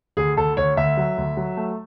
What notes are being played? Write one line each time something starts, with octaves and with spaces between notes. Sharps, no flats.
D2 G#4
D2 A4
D2 C#5
D2 E5
F#3
D2
F#3
A3